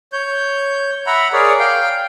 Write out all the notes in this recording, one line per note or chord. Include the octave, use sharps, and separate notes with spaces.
C#5 G6
E5 F#5 A#5 B5
G#4 A#4 C#5 D5
F5 G5